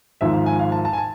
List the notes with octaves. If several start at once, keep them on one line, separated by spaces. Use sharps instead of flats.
G#1 G#2 F3 E5
F5
G#5
F5
A5
A5
G#5
A5